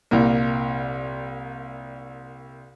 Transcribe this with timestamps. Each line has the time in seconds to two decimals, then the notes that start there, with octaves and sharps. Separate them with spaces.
0.11 C2 A#2 A#3